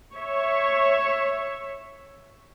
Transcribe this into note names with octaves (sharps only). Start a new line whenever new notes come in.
C#5 E5